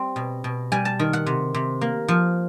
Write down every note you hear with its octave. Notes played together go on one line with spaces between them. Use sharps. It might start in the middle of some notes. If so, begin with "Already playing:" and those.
Already playing: G3 C4
B2
B2
G3 G#5
A5
D#3
F#5
C3
C3
A#3
F3